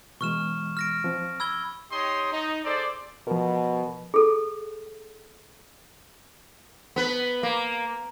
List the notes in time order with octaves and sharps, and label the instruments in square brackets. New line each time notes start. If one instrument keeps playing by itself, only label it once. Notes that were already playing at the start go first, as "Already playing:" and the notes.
[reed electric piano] B2 E3 G#3 [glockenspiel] C#6 F6 E7
[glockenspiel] F6 A#6 D7
[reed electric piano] F3 C4
[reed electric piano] B5 [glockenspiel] E6 G#6 G7
[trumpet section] D#4 G4 C#5 D#5 C6 D#6
D#4
G#4 A4 C5 D5
[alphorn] B2 [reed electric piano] F3 A#4
[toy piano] G#4 A4
[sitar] B3 B4
A#3